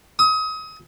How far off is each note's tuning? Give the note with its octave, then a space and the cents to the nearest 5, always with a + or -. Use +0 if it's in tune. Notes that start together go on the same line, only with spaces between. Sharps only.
D#6 +35